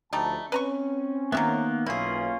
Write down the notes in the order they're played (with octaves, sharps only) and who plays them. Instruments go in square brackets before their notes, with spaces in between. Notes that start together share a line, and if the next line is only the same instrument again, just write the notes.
[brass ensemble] D2 F3 A5 [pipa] G3 A3 D#4
[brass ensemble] C4 C#4 [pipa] B4 A#5 C#6
[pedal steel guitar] D#3 A#3 B3 [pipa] F#3 G4 E5
[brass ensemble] B1 [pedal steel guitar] A#3 C#4 F4 [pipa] E4 G#4